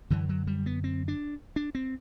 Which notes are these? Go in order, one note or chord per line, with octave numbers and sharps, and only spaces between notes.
F#2 D3 E3
F#3
G3
B3
C4
D4
D4
C4